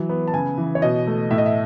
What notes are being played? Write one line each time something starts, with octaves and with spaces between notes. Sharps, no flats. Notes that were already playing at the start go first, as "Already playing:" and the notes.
Already playing: E3 F#3
B3
A5
C#3 G#5
E3
C#5
B2 D#5
A3
A2 E5
D#5
E5